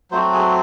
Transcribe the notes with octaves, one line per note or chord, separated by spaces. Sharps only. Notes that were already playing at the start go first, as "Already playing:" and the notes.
F#3 A3 C4 F#4 C5
G#4